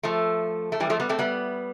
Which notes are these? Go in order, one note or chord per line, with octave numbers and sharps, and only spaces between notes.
F3 A3
A3
E3 G3
F3 A3
G3 B3
A3 C4
G3 B3